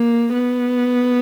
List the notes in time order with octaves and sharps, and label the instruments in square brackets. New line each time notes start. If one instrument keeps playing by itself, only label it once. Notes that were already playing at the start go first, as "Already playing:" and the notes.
Already playing: [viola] A#3
B3